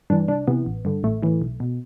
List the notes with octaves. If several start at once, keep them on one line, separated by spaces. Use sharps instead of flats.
G2 E3 D4
C2 D4
C3 E3 B3
A1
G2 D3
A1 A3
A2 E3
B1
B2